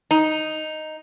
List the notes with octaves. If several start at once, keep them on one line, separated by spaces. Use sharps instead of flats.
D#4